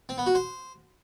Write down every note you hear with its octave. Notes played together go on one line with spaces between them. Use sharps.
C4
B3
F#4
C5